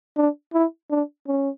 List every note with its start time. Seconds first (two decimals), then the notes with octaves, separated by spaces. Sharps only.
0.17 D4
0.54 E4
0.90 D4
1.27 C#4